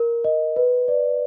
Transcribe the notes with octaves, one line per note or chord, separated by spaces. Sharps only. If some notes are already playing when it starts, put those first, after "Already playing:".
Already playing: A#4
D#5
B4
D5